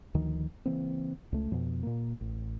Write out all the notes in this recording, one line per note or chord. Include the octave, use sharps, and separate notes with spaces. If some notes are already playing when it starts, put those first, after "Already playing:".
D2 D#3 F3
C#3 E3 A#3 C4
C#2 A3
F2 B2
A#2 A#3
A1